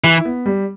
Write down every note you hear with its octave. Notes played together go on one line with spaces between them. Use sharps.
E3 E4
B3
G3